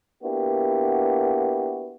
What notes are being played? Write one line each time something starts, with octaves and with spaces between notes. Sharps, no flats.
A#3 B3 D4 E4 F#4 G4